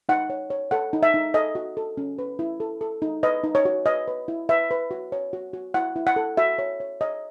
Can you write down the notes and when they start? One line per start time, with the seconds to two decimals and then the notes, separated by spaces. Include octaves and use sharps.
0.09 D#4 F#5
0.30 C#5
0.50 C#5
0.71 A4 F#5
0.93 D#4
1.03 E5
1.14 D#4
1.34 A4 D#5
1.55 F#4
1.77 A4
1.97 C#4
2.19 B4
2.39 E4
2.60 A4
2.81 A4
3.02 D#4
3.23 B4 D#5
3.44 D#4
3.55 C#5
3.65 F#4
3.86 B4 D#5
4.08 B4
4.28 E4
4.49 B4 E5
4.71 B4
4.91 F#4
5.12 C#5
5.33 F#4
5.53 F#4
5.74 E4 F#5
5.96 E4
6.07 F#5
6.16 A4
6.37 F#4 E5
6.59 C#5
6.80 C#5
7.01 C#5 D#5